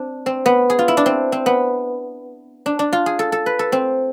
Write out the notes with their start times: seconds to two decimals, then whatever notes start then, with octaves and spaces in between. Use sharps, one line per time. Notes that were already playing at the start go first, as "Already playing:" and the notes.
Already playing: C4 D4
0.26 C4
0.46 B3
0.70 G#4
0.79 F4
0.88 E4
0.97 D4
1.06 C4
1.32 C4
1.46 B3
2.66 D4
2.79 D4
2.93 F4
3.06 G#4
3.19 A4
3.32 A4
3.46 B4
3.59 A4
3.72 C4